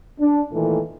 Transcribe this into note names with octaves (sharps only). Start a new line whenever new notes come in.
D4
A#2 D#3 E3 A3